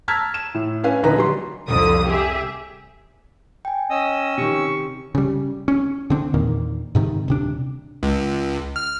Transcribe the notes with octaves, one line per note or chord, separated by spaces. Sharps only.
A5 A#5 E6 F6 G#6 B6
E7
A2
C#4 D4 B4 F5 G#5
D#1 A#1 D3 D#4 B4 A#5
F#3 G3 C6
C2 F2 D3 D#6
G4 G#4 E5
G5 G#5
C#4 D#5 E6
C3 D#3 C#6
C#3 G3
C#4
D3 C4 D4
E2 A#2 D#3 A#3
G#2 C3 D#3
D#1 C3 D4
C#2
F6